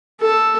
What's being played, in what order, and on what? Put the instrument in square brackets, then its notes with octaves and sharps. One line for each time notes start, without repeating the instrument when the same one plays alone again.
[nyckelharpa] A4